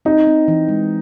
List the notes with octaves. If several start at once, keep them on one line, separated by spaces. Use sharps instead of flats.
C4 D#4
C4
E3
G#3